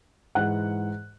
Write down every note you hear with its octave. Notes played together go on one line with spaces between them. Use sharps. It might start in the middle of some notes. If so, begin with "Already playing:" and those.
G#2 E3 F#5 F#6